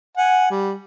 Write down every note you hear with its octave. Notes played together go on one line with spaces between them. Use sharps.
F#5 G#5
G3